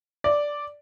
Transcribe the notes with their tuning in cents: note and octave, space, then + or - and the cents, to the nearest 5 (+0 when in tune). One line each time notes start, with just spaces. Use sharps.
D5 -5